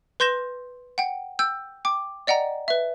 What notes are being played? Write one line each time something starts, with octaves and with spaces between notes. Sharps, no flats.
B4 C6 G6 A#6 E7
F#5 G5
G5 E6 G6
G5 D6
D5 D#5 F#5 G5 A#5
B4 E5